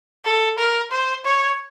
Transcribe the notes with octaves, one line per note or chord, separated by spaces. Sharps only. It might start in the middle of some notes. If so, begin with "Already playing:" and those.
A4
A#4
C5
C#5